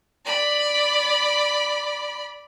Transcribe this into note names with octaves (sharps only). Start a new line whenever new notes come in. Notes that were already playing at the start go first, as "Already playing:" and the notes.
D5 B5